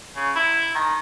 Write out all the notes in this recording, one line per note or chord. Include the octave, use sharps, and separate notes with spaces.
C#3
E4
D#3